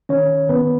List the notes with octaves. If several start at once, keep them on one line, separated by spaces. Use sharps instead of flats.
D#3 C#4 C#5
D#3 B3 B4